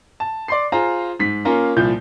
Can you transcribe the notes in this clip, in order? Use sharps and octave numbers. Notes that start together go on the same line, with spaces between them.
A5
D5 C6 C7
F4 G#4 C5 A#5
G#2 B6
A#3 C#4 F4 A#5
C2 A#2 F3 G6